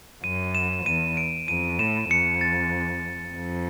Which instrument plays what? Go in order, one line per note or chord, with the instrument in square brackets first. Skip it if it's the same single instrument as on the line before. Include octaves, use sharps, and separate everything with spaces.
[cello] F#2 [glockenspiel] D#7
[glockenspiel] E7
[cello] E2 [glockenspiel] D#7
[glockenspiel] D7
[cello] F2 [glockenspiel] D#7
[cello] A2 [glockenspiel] E7
[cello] F2 [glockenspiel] C#7
[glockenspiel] A6
[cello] F2